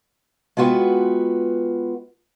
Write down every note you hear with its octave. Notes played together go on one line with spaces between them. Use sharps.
G#3 B3 F4 F#4 B4 G5